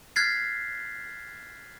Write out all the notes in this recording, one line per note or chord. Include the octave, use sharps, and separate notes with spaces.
F6 F#6 G#6 A6 B6 C7